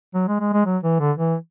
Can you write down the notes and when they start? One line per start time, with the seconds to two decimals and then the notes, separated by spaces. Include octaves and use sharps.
0.15 F#3
0.28 G#3
0.40 G#3
0.53 G#3
0.66 F#3
0.83 E3
1.00 D3
1.17 E3